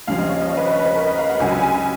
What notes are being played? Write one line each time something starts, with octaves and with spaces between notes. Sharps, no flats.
D#2 C#3 F3 F5
D#5
C#5
D#5
C#5
B4
D#5
C#5
B4
A#4
D#5
F5
F#5
C#2 C#3 F#3 G#5
G#5
G#5